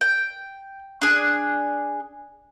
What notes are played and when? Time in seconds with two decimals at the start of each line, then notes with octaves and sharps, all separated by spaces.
0.01 G5
1.01 D4 G#4